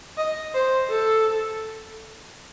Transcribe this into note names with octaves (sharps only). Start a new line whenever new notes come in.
D#5
C5
A4